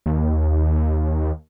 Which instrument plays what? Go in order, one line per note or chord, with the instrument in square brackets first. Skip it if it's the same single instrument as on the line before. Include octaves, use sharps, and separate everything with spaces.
[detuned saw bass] D#2